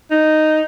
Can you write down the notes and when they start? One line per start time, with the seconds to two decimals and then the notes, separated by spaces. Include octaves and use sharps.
0.11 D#4